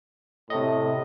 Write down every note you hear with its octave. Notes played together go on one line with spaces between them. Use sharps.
A2 C3 D#5